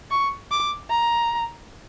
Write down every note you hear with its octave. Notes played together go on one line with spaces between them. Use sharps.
C#6
D6
A#5